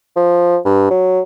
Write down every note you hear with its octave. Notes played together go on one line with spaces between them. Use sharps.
F3
G2
F#3